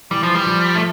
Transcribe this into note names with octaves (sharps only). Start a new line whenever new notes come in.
E3 G3
F3
G3
F3
A3